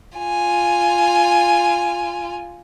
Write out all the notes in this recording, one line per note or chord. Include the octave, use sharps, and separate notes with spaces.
F4 G#5